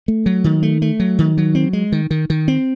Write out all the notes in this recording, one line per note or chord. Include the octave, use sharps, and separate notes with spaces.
A3
F#3
D#3
A3
A3
F#3
D#3
F#3
C4
G#3
D#3
D#3
D#3
C4